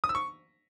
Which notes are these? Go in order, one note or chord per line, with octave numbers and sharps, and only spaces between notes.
D#6
E6
C#6